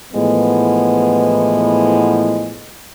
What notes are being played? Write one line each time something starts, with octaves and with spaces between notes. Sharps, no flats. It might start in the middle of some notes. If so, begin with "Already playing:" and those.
A2 E3 F3 G#3 B3